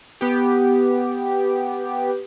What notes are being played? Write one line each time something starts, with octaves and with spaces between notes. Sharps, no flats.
B3 G4